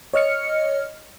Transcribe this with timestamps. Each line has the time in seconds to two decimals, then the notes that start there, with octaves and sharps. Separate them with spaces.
0.14 C#5 D#5 F6 C#7